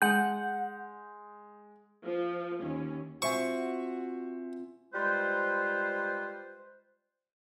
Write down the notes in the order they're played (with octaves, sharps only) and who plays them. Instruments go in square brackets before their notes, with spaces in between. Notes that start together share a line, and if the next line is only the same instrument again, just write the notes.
[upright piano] G#3 [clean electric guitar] F#5 [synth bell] G6
[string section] F3
D#2 C#4
[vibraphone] C4 F4 [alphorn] F#4 [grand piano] C5 E5 G#5 [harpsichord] C#6
[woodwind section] G3 G#3 F4 B4 C5